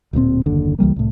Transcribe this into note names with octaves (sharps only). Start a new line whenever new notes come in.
D1 A#2 A#3 C4
F#1 D#2 D3
C#2 E3 G3 A#3
C2 A2